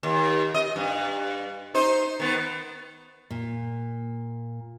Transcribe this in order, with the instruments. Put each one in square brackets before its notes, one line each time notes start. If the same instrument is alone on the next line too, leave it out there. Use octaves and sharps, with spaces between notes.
[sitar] D#2
D#5
G2
D#4 C5
D#3 B3
[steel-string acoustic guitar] A#2